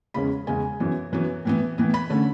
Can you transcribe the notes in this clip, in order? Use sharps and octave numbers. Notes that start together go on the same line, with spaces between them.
E2 C#3 G#3 C#4 B5
E2 C#3 G#3 C#4 G#5
F#2 E3 B3
F#2 E3 B3
A2 E3 B3
A2 E3 B3
B5
D3 A3 C#4